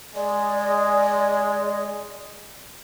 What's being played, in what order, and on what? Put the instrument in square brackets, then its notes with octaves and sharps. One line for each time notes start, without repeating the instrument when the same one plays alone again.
[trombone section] G#3 [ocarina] D5